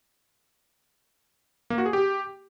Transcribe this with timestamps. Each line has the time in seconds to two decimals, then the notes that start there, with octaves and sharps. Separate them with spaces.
1.70 A#3
1.78 F#4
1.86 G#4
1.93 G4